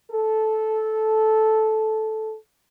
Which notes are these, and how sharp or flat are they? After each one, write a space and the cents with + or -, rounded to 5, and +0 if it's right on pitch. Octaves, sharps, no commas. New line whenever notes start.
A4 -10